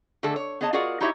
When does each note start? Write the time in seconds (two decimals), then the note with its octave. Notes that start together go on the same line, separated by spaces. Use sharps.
0.23 D3 A3 D4 G#4 A4
0.36 C#5
0.61 B3 G#4 C#5 D#5 A5
0.73 F4 F#4 G#4 A#4 D5 F#5
1.00 D#4 E4 F#4 G4 C#5 E5